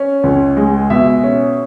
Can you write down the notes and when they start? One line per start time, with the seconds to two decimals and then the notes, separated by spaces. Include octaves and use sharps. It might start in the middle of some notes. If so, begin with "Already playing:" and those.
Already playing: C#4
0.23 C#2
0.57 G#3
0.90 B2 E5
1.24 C#4